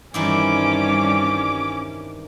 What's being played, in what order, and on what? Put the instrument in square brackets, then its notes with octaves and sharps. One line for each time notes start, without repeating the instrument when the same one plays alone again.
[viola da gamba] G2 G3 [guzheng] D#3 E3 C4 [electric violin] C#4 D6